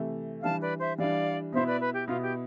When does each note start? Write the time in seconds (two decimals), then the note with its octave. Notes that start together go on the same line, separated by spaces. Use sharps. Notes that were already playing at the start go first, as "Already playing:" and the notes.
Already playing: C3 E3 A3
0.43 E3 G3 D4 F5 A5
0.61 B4 D5
0.79 C5 E5
0.98 E3 G3 D4 D5 F5
1.52 B2 B3 E4 C5 E5
1.67 B4 D5
1.81 B4
1.94 G4
2.08 B2 B3 E4 F4
2.22 G4